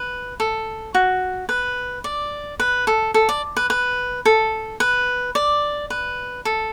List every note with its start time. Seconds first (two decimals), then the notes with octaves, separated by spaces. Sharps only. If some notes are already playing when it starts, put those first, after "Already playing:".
Already playing: B4
0.40 A4
0.94 F#4
1.49 B4
2.04 D5
2.60 B4
2.87 A4
3.14 A4
3.29 D5
3.57 B4
3.70 B4
4.25 A4
4.80 B4
5.35 D5
5.90 B4
6.45 A4